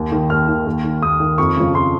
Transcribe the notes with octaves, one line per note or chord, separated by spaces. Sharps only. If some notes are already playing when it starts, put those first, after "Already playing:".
Already playing: D#2
D#3
D#2 F6
D#3
D#2
D#3
D#2 D#6
D#3
F2 C#6
C#3 F3
F2 C6